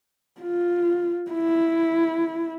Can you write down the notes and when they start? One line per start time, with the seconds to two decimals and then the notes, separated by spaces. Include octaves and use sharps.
0.41 F4
1.31 E4